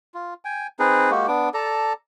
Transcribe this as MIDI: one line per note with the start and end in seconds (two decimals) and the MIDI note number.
0.14 0.34 65
0.45 0.67 79
0.45 0.67 80
0.79 1.11 60
0.79 1.11 63
0.79 1.11 68
0.79 1.11 71
1.11 1.27 56
1.11 1.27 58
1.11 1.27 66
1.11 1.27 67
1.28 1.49 59
1.28 1.49 62
1.28 1.49 86
1.54 1.93 69
1.54 1.93 74
1.54 1.93 81
1.54 1.93 82